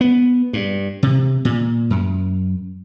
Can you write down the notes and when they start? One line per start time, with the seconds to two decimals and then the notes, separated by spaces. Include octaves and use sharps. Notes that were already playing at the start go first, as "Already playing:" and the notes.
0.01 B3
0.53 G2
1.03 C3
1.45 A#2
1.90 F#2